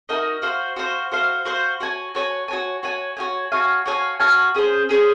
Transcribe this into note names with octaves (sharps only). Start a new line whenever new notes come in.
D#4 F#4 A#4 D#5
F#4 C5 F5
F#4 C5 F5
F#4 C5 F5
F#4 C5 F5
F#4 C#5 G#5
F#4 C#5 G#5
F#4 C#5 G#5
F#4 C#5 G#5
F#4 C#5 F5 G#5
F#4 C#5 F5 G#5
F#4 C#5 F5 G#5
F#4 C#5 F5 G#5
C#4 G#4 C5
C#4 G#4 C5